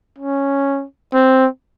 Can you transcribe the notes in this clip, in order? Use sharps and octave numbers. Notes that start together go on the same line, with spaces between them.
C#4
C4